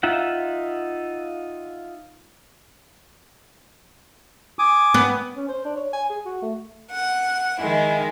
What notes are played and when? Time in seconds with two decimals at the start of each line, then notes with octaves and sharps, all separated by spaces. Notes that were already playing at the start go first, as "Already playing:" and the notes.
0.03 D#4 F4 E5 F#5
4.59 G#5 D6 D#6
4.94 B3
5.37 C#4
5.49 C5
5.65 D4
5.76 C#5
5.93 G#5
6.09 G#4
6.25 F#4
6.42 A3
6.91 F#5
7.60 D#3 G#3 E4